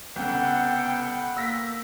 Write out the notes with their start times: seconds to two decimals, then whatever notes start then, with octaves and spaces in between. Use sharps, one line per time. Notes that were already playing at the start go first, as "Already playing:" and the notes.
0.16 C2 C#3 B3 A4 F#5 G5
1.37 A#3 E6 A#6 B6